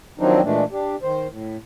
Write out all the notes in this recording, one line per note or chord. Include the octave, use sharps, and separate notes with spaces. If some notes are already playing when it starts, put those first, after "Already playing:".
D#3 F3 F#3 C4 D4 D#4
A#2 E3 G#3 A3 D4
D4 G4
D#3 C5
A2